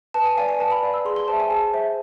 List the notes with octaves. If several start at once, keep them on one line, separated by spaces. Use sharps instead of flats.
B4 A5
G#5
D5 F5 G#5
G#5
B4 A5
B5
D5 F5
E6
G#4 C6
C6
C5 E5 A5
G#5
G#4 A5
C5 E5